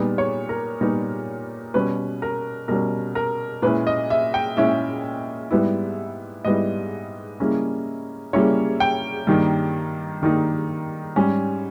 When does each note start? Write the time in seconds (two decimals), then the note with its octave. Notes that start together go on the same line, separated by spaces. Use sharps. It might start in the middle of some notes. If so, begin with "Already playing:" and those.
Already playing: A#2 G3 B3 D#4
0.18 C#5
0.49 A#4
0.81 A#2 G3 B3 D#4
1.74 B2 G3 C#4 B4
2.22 A#4
2.68 B2 G3 C#4 A#4
3.15 A#4
3.62 A#2 G#3 C#4 E4 B4
3.87 D#5
4.10 E5
4.34 G5
4.57 A#2 G#3 C#4 E4 E5
5.51 G#2 G3 B3 E4
6.45 G#2 G3 B3 E4 D#5
7.40 C#3 G3 A#3 C#4 E4
8.33 C#3 G3 A#3 C#4 E4 C#5
8.80 G5
9.27 G2 D#3 G3 A#3 D#4
10.22 G2 D#3 G3 A#3 D#4
11.16 G#2 G3 C#4 G#5